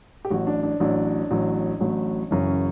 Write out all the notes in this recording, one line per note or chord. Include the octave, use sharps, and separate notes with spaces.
G4
A1 A2 F#3 F#4
D4
D4
A1 A2 F#3 D4
A1 A2 F#3
A1 A2 F#3
F#1 F#2 C#3 E3 C#4
C#4